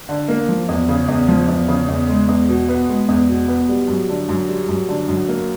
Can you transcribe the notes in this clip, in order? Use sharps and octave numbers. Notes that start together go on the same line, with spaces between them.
D3
A#3
F3
E2
C#3
E2
F3
E2
C#3
E2
G#3
E2
B2
B3
G#3
E2
B2
B3
G3
F#2
D3
F#2
G3
F#2
D3
F#2
A#3